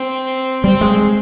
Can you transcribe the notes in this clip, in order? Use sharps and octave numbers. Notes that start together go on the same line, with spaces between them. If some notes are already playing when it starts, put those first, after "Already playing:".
Already playing: C4
G3 C4
G#3